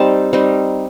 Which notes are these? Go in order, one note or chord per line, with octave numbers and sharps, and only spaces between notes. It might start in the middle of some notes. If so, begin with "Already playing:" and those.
Already playing: G3 C4 D#4 A5
G3 C4 D#4